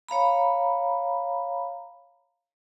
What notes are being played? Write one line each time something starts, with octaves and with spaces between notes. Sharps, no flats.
C#5 F5 A#5 B5